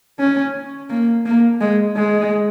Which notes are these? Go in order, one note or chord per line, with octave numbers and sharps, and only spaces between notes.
C#4
A#3
A#3
G#3
G#3